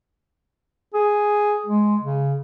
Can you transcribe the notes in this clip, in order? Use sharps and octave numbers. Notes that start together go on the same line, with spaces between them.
G#4
G#3
C#3